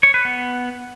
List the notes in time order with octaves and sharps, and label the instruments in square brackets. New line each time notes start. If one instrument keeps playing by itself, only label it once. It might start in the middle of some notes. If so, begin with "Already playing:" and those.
[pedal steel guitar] C#5
B4
B3